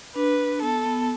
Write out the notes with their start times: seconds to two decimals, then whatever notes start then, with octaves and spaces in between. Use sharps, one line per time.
0.15 D4 B4
0.39 D4
0.62 B3 A4
0.85 B3